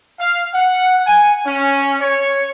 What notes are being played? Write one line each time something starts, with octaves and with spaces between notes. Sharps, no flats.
F5
F#5
G#5
C#4
C#5